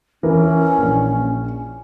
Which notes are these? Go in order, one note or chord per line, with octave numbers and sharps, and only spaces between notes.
E3 C#4 A#4
A#1